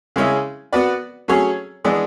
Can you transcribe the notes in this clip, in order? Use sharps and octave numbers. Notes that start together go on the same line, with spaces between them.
C#3 G#3 C#4 E4
B3 F#4 B4 D5
F#3 A3 C#4 G#4 C#5
E3 G#3 B3 D4